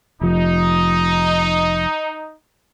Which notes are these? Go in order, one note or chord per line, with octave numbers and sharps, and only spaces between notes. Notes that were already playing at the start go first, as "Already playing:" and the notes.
F1 F3 D#4